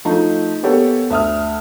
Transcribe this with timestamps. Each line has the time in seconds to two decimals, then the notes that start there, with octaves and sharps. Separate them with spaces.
0.05 F3 A3 D#4
0.63 A#3 B3 G4 A4 C#5
1.10 D2 E5 D#6 F6